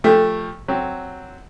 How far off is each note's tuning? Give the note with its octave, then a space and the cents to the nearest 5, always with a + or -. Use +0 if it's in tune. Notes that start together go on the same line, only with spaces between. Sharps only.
F3 +15 A3 +0 G4 +15
F#3 +0 C4 +0